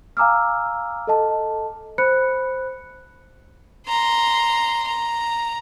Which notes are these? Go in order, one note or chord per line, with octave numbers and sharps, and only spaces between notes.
F5 G#5 A#5 D6 E6 F6
A4 D#5 A5
C5 B5 F#6 C#7
A#5 C6
A#5